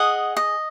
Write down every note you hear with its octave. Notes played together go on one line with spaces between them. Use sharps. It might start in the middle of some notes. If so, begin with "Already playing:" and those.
Already playing: G#4 D#5 F#5
D#5